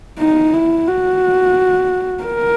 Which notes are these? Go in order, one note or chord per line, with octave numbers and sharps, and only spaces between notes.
D#4
E4
F#4
A#4